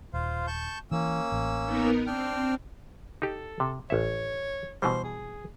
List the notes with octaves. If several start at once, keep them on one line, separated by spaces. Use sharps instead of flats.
D#1 F4 C5 F5
A5 C#6 G6
E3 A#3 C#4 E6
A1
B3 D#4 A#4
C4 D4 G5 F6
D#4 G4 A4
C3
A1 C#5 E5
B2 E3 G3 C5
G#4